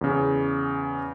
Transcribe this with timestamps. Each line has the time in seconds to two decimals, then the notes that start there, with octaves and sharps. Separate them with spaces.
0.01 E2 C#3